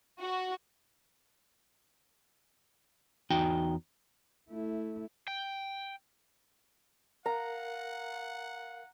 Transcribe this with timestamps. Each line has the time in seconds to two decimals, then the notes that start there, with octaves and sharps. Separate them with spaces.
0.20 F#4
3.30 E2 D#4 F#4 G5
4.50 A3 E4
5.28 G5
7.26 A#4 F5 F#5 A#5